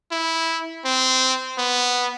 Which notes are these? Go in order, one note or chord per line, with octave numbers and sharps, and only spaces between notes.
E4
C4
B3